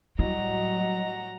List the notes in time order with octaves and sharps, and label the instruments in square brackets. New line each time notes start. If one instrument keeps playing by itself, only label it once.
[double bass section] A2 F#3 G3 [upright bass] E4 [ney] D#5 [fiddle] F#5 A#5